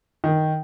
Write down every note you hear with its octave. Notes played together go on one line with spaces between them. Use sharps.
D#3